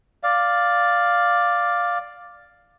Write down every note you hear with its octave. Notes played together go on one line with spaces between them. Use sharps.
D5 F5